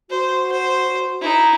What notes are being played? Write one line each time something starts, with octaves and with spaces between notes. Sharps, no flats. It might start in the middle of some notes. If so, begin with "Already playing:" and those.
F#4 C5
C5
D#4 E4